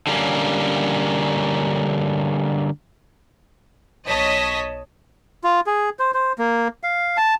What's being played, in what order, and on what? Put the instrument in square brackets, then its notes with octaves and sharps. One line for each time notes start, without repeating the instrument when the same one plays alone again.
[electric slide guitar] D3 G3 A#3 C#4
[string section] B1 C#5 D#5 A5 B6
[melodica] F4
G#4
C5
C5
A#3
F5
A5